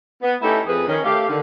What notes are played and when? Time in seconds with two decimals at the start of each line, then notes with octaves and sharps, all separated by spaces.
0.22 B3
0.42 A3 C#4 D#4 E4 G4 A4
0.67 F2 G#4 B4
0.88 D#3 C#4
1.04 A3 G4 F5
1.29 D3 D#3